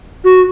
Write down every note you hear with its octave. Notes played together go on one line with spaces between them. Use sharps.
F#4